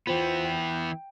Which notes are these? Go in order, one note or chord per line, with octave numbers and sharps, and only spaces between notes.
E3 B3 F4 C5 G5
G5